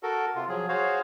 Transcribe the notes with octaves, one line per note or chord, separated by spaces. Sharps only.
F#4 A4 A#4
C3 F4
F3 F#3 G#4
F#4 G#4 C5 C#5 F5